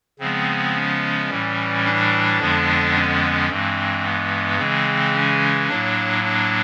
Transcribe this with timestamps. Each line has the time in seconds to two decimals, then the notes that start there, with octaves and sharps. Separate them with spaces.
0.19 C#3 F3 G#3 B3 C4
0.75 C#4
1.30 A2 E3 G3
1.84 D4
2.40 F2 D3 F3 G#3 B3
2.94 C#4
3.48 G2 E3 G#3 C4
4.04 B3
4.58 C#3 E3 G#3 C4
5.14 C#4
5.68 A2 F#3 A#3 D4
6.23 D4